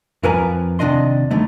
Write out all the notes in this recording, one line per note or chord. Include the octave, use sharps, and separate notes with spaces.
F2 F3 A#4 B4 G#5 A#5
D#2 C3 D4 D#5 C6
D3 D#3 F#3 A3 D#4